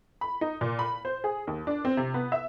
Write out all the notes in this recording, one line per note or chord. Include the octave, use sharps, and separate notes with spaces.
B5
D#4
A#2
B5
C5
G#4
D#2
D4
C4
C3
B3
E5